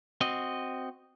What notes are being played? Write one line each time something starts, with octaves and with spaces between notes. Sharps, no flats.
C4 F#4 D#5